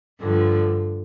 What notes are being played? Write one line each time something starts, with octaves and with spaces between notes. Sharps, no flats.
G2 D3 F3